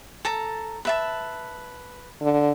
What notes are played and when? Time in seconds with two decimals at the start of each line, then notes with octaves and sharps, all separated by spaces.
0.25 A4 A5 A#5
0.85 B4 E5 A5
2.22 D3